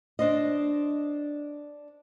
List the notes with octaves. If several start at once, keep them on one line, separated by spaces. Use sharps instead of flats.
D4 C5 D#5